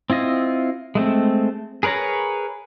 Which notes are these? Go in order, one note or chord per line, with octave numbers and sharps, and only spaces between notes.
C4 E4 F4 D#5
G#3 A3 C4
G#4 A#4 B4 C#5 A#5